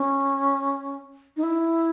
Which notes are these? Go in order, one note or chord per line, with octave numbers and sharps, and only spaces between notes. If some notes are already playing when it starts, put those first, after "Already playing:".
Already playing: C#4
D#4
E4